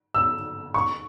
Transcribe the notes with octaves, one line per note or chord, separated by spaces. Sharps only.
E6
C#6